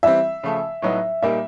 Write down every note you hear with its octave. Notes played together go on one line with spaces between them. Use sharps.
E3 G3 C4 E5
C#3 F3 A3
A2 F#3 B3 D#4
A#2 G3 A#3 D#4 E5